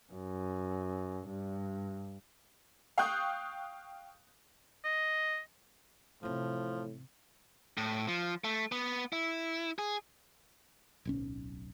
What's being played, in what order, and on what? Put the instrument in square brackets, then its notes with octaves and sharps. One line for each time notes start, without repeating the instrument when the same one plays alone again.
[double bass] F#2
G2
[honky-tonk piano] F5 G5 C#6 D#6 F#6 G6
[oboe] D#5
[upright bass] A1 C3 [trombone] A2 [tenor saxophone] F3
[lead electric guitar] A2
F3
A3
B3
E4
G#4
[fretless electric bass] D1 B1 C#4